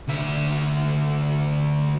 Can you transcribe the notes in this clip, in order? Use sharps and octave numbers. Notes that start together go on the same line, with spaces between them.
D2 E5